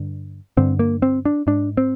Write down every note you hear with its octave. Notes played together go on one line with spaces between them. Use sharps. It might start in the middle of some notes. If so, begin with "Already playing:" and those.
Already playing: G2 D3
G2 D3 C4
A#3
C4
D4
G#2 D4
C4